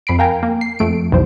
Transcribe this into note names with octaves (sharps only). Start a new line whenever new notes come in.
F2 B5 C7 D7
A#4 F5 G5 G#5 A#5
A#3
C7
F2 A3 D7
B1 E2 C5